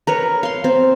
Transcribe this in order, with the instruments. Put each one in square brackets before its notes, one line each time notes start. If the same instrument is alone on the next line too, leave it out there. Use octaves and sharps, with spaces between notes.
[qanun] A#4 B4 C#5
F5 C6
C4